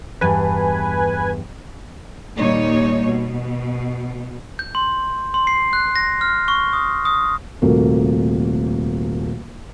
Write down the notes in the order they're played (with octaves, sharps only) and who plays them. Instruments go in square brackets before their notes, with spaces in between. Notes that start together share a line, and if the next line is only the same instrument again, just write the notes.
[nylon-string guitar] E2 G2 [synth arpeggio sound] B4 G#5
[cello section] D#2 A#2 G3 A#3 D#4 C#5
B2
[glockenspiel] G6
C6
C6
C7
F#6
A#6
F6
C#6
D#6
D#6
[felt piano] D#1 C3 A3 A#3 F#4